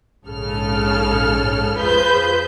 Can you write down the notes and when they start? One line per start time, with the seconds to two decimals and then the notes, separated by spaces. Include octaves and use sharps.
0.26 A#1 G#2 C#3 A4 F6
1.76 F2 F4 G#4 B4 C5 G6